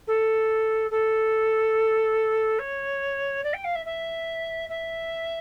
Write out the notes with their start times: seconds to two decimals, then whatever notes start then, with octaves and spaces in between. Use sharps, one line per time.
0.07 A4
0.90 A4
2.59 C#5
3.43 D5
3.53 G5
3.64 F5
3.75 E5
3.85 E5
4.69 E5